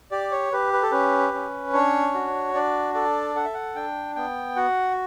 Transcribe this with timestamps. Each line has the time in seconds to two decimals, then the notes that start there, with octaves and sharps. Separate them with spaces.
0.11 G4 D5
0.32 C#5
0.52 G4 B4
0.73 B4
0.82 A4
0.92 C#4 B4
1.33 C#4
1.73 D4 C#5
2.14 F#4
2.54 D4 D5
2.94 A4 D5
3.35 A4 F#5
3.45 E5
3.54 F#5
3.75 D4 G5
4.16 B3 G5
4.56 F#4 F#5